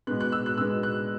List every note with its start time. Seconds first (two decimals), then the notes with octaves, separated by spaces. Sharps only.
0.07 B2 G#3 B3 F#6
0.20 F#6
0.32 E6
0.46 F#6
0.57 B2 E6
0.61 G#3 B3
0.83 F#6